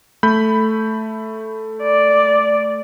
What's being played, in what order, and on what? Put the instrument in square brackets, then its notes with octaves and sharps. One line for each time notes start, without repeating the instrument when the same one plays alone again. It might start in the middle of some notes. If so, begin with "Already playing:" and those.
[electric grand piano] A3 B5 G6
[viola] D5